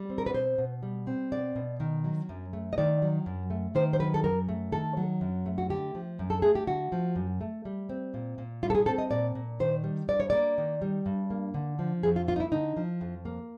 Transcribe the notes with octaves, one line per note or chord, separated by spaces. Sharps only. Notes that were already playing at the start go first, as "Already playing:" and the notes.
Already playing: G3
C4
A#4
B4
B2 C5
B2
G3
C4
B2 D5
B2
D#3
F#3
F#2
A3
D#5
D#3 D5
F#3
F#2
A3
D#3 C5
C5
F#3 B4
A4
F#2 A#4
A3
D#3 A4
F#3
F#2
A3
F#4
D3 G4
F3
F#2
A4
A3 G#4
G4
D3 F#4
F3
F#2
A3
G3
C4
A#2
A#2
G3 F4
A4
G#4
C4 A4
D#5
A#2 D5
A#2
D#3 C5
G3
G2 D5
C#5
A#3 D5
D#3
G3
G2
A#3
D3
F3
F2 G#4
F4
A#3 F4
D#4
E4
D3 D#4
F3
F2
A#3